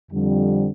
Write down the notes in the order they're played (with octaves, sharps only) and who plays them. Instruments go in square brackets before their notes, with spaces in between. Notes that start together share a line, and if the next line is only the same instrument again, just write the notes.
[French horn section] F2 D3 G3 C4